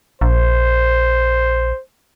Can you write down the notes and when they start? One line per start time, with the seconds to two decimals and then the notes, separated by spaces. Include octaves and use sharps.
0.21 A#1 C5